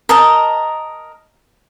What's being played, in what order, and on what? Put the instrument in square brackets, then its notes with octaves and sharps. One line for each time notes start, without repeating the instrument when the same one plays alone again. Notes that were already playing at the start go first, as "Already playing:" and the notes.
[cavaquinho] A#4 D#5 A5